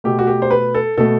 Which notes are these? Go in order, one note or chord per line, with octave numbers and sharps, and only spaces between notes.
B2 A3 G4
F#4
G4
C5
B4
A4
B2 A3 A4